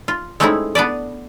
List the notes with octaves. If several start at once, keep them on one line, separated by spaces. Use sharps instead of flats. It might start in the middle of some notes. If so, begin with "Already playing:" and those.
F4
G#3 A3 C4 C#4 D#4 E4
B3 D4 B4 D5